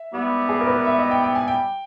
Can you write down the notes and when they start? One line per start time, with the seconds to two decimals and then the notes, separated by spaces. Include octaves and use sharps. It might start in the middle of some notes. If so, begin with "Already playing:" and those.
Already playing: E5
0.11 G#2 G3 B3 E4
0.49 G#4
0.61 A#4
0.67 B4
0.73 A#4
0.86 E5
0.99 D#5
1.11 G5
1.24 G5
1.35 G#5
1.48 G5